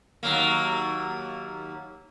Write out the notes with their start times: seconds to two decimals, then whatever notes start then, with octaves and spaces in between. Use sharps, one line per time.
0.23 D#2 F#3 A#3